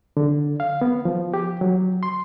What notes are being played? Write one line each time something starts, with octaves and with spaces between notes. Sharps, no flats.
D3
F5
B3
F3
G4
F#3
C6